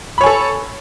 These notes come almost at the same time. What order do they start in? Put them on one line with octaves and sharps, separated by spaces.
B5 C#5 G#5 A4